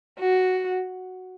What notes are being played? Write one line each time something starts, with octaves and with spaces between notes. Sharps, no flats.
F#4